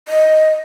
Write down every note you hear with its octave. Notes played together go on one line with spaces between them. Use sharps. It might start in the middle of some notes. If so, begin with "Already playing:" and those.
D#5